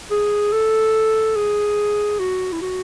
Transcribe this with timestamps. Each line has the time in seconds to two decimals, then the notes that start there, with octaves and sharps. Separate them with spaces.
0.11 G#4
0.53 A4
1.36 G#4
2.20 F#4
2.52 E4
2.62 F#4